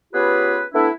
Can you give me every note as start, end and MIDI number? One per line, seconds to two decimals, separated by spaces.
0.13 0.62 59
0.13 0.62 61
0.13 0.62 65
0.13 0.62 67
0.13 0.62 68
0.13 0.62 71
0.74 0.88 57
0.74 0.88 59
0.74 0.88 62
0.74 0.88 64